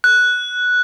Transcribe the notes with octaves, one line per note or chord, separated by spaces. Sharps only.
F#6